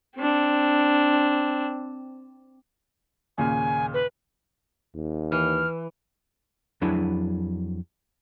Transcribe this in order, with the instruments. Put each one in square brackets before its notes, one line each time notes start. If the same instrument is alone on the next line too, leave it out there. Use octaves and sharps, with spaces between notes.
[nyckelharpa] C4 D4
[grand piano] D#2 A#2 C#3 [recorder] G#5
[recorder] B4
[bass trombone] D#2
[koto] E3 [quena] F6
[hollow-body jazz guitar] F2 F#3 D4 E4 G#4 B4